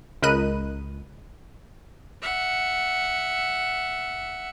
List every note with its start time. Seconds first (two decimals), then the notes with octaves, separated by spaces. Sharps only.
0.23 C#2 A#4 D#5 B5 F#6 D#7
2.22 E5 F#5